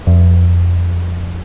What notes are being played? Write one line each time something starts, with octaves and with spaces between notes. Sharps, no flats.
F2